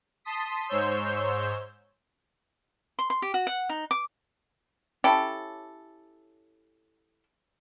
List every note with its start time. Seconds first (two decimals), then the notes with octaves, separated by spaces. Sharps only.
0.25 A5 C6 D#6 B6
0.67 G#2 C5 C#5 E6 G6
2.99 C6
3.10 C6
3.22 G4
3.34 F#4
3.47 F#5
3.69 D#4
3.91 D6
5.04 C#4 E4 G4 A4